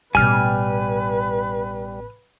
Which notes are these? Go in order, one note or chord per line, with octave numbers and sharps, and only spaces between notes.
A1 B2 G3 B4 G#5 F6